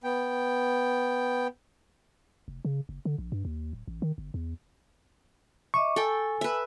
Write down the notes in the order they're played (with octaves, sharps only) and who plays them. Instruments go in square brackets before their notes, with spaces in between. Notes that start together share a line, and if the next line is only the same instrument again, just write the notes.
[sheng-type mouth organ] B3 G5
[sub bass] F1
C#3
F#1
D3
A#1
G2
D#2
D1
A1
D#3
G1
E2
[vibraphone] D#5 E5 D6 [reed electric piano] C#6
[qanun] A4 G5 [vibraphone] G#5
[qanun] B4 E5